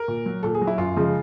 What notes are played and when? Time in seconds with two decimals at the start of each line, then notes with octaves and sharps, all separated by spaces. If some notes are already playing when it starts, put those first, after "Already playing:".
Already playing: A#4
0.08 A#2
0.26 F#3
0.43 A#2 A4
0.55 G#4
0.62 F#3
0.67 E4
0.78 F#2 F4
0.96 C#3 F3 G#3